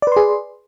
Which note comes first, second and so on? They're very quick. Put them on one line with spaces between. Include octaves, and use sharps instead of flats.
D5 B4 C6 G#4